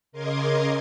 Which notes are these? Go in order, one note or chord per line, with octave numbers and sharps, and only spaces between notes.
C#3 A#4 D#5 C6 D6 G#6